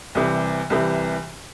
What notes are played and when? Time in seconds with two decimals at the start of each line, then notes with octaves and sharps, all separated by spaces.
0.15 C2 C3 E3
0.70 C2 C3 E3